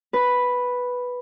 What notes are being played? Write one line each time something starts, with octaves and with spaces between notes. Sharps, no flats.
B4